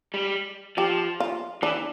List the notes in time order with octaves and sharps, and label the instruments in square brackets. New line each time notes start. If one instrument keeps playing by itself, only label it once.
[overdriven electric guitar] G3
[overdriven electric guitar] F3 [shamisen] G4
[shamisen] F4
[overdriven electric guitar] E3 [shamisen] D4